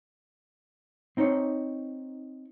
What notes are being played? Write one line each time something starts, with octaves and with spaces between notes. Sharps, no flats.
C4 D#4 C5 C#5